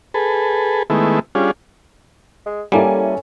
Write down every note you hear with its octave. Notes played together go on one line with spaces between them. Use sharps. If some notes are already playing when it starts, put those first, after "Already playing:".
G#4 A4 B4
D#3 G#3 A3 B3 E4
G3 C#4 D4 F4 G#4
G#3
G3 A#3 C#4 E4 A4 G#5